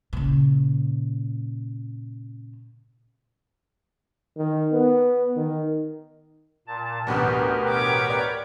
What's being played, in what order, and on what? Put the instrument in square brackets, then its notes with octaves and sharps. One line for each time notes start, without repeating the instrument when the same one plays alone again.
[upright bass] A#2 C#3
[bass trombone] D#3
B3
D#3
[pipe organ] A#2 A5
[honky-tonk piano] A1 D2 B2 [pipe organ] G4 A#4 B4
[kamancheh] C#5 D6
[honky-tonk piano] D5